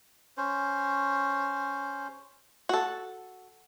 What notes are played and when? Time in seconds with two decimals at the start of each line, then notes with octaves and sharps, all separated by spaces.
0.37 C#4 C5
2.69 F#4 A4